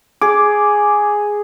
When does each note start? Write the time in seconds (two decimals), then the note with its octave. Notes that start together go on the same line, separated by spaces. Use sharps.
0.21 G#4 D6